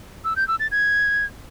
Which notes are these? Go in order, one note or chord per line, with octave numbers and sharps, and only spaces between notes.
E6
G6
E6
A6
G#6